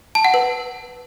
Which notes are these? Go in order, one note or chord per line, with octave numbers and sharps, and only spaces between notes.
A5
F#5
B4